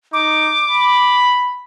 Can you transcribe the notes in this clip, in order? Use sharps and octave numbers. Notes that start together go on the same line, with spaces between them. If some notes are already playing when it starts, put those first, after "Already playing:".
D#4 D6
B5